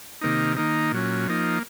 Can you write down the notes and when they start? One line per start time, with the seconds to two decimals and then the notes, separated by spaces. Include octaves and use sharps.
0.21 C3 D#3 A#3 D#4
0.57 D#3 A#3 D#4
0.92 A#2 F#3 C#4
1.28 F3 A#3 D#4